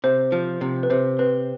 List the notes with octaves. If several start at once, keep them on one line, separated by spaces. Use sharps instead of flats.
C3 C5
F3
C3
B4
C3 C5
C4 B4